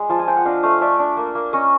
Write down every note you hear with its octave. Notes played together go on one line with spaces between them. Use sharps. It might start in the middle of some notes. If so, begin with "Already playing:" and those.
Already playing: G#3 D5
F3 A5
G#5
F3 G5
F#5
D4 D#5 F5
A3 D#5 F5
A3 D5 E5
D4
A#3
A#3
C#4 C#5 D#5